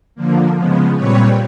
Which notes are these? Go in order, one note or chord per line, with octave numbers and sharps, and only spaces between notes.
D3 F3 A#3
C#3 F3 G#3 B3
A#2 G3 C4 B4 C#5